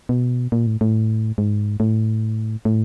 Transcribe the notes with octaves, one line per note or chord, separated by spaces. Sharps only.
B2
A#2
A2
A2
G#2
A2
A2